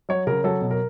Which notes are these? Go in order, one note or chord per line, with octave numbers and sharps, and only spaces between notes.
F#3 C#5
C#3 A#4
F#3 A4
B2
A#4